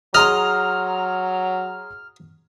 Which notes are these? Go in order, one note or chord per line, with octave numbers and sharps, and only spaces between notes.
F#3 G#4 D#5 A#5 C6 F6